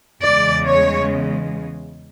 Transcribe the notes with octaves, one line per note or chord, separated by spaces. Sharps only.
E2 C#3 G#3 D5
C#5